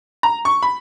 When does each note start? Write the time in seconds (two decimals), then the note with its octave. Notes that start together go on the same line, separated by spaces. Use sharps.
0.23 A#5
0.45 C#6
0.63 B5